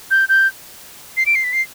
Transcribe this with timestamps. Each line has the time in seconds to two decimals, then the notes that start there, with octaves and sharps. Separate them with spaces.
0.11 G6
0.29 G6
1.17 C7
1.26 D7
1.35 C7
1.44 B6
1.53 C7